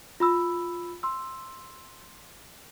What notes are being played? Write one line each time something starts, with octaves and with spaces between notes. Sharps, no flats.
F4 B5 E6
C6 E6